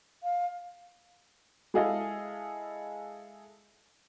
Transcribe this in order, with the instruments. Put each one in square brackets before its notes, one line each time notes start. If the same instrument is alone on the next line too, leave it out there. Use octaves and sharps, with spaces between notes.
[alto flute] F5
[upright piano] G#3 E4 G#4 A4 D#5 F5